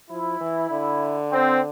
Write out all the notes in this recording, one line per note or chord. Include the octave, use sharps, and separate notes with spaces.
F3 E4
E3
D3
C4